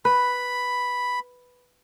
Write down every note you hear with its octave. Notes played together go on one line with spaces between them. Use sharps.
B4 B5